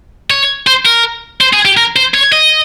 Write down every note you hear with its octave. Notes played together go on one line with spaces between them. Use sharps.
C#5
C5
A#4
C5
G#4
G4
A#4
C5
C#5
D#5